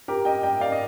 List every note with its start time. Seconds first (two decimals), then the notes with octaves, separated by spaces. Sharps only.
0.08 G4 A#4
0.25 D#5 G5
0.43 D#5 G5
0.61 D5 F5
0.72 D#5